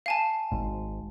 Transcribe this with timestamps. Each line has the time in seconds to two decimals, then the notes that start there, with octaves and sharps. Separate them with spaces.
0.06 F5 G#5 A5
0.52 G#1 G#2